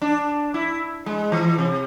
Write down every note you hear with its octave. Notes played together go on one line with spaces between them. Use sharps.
D4
E4
G#3
E3
C3